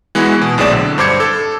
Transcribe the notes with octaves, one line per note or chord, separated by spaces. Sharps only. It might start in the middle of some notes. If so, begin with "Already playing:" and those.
E3 G#3 B3 E4 F#4
B2
B1 A2 C4 G#4 D5 E7
D3
G2 C5 D6 G#6 C#7
A4